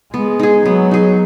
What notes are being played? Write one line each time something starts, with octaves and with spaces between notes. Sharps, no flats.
G#3 B3
D#4 G#4
F#3 B3
D#4 G#4